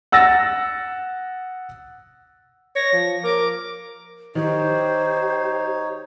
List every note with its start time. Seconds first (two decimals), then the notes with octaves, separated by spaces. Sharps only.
0.12 F#5 E6 A6 A#6
2.76 C#5 A#6
2.93 F3
3.24 A#4 D6
4.35 D#3 D#4 G4 C5 C#5